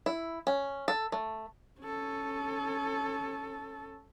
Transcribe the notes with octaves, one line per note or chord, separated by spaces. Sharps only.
E4
C#4
A4
A3
C#4 A4